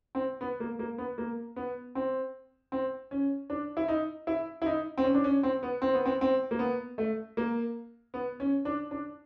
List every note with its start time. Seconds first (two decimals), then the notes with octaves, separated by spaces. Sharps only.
0.15 C4
0.41 B3
0.60 A#3
0.79 A#3
0.98 B3
1.18 A#3
1.56 B3
1.95 C4
2.72 C4
3.11 C#4
3.50 D4
3.77 E4
3.88 D#4
4.27 E4
4.62 E4
4.66 D#4
4.98 C4
5.04 C#4
5.14 D4
5.24 C#4
5.43 C4
5.63 B3
5.82 C4
5.94 B3
6.06 C4
6.21 C4
6.51 A#3
6.59 B3
6.98 A3
7.37 A#3
8.14 B3
8.40 C#4
8.65 D4
8.91 D4